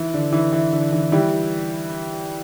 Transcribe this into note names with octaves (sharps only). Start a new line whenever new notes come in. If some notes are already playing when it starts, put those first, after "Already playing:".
Already playing: E3
D3
E3
E3
D3
E3
E3 G3